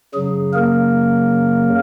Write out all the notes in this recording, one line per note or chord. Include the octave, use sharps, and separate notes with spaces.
F#2 C#3 F#3 G#4
A#3 A#4